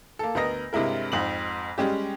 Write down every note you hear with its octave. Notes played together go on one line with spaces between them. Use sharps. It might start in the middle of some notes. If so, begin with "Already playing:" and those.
A#3 A4
D2 B3 A#4 D#5 A#6
G2 C3 G#3 E4 A#4
F2 G#2 F#7
G3 G#3 C#4 G4